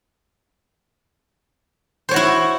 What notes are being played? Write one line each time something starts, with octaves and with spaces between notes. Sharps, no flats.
E4 F#4 C5 C#5